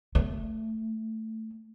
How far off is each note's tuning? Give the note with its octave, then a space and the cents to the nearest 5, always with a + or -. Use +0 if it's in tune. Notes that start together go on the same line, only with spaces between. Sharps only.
A3 +10